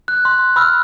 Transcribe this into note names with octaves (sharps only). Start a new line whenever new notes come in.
F#6
C6
B5 E6 F6